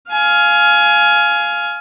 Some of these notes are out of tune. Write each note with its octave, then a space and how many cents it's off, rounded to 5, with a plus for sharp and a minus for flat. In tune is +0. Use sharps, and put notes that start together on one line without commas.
F5 +0 G#5 +20